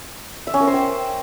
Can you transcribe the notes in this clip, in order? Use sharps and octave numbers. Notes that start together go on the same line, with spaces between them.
E5
C#4
A#4
C5
G5